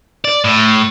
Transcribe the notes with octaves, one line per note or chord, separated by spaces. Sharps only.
D5
A2